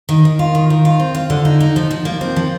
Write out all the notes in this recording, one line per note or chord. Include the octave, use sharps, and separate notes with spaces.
D#3
D#3
F4
D#3
D#3
F4
C4
F4
D3
D#4
D#4
F3
F3
A#3
C4
F3